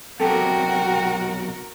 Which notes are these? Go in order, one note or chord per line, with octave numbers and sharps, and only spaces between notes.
B1 C3 F#4 A4 A#4 G5